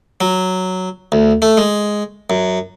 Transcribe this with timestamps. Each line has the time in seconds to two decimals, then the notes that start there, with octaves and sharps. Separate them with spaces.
0.21 F#3
1.12 D2
1.42 A3
1.57 G#3
2.30 F#2